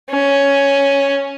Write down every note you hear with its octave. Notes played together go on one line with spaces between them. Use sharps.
C#4